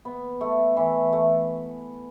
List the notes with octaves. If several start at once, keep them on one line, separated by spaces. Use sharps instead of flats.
B3
A3
E3
A3